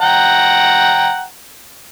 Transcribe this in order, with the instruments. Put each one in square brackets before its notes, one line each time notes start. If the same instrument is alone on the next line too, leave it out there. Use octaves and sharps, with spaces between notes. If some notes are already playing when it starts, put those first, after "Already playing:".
[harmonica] F#5 G5 A#5